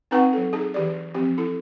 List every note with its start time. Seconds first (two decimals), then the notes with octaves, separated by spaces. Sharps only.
0.11 C4 D#4 B4 F#5 G5 C#6
0.33 F#3 A4
0.53 D#4 G#4
0.74 E3 G4 D5
1.14 F3 C4 G4
1.38 E4 A4